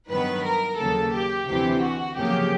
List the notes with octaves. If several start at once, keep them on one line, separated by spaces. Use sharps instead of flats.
G2 D#3 F#3 B3 B4
A#4
D#2 C#3 F#3 A#3 A4
G4
D2 C3 E3 G4
F#4
F2 C#3 F#3 A#3 G4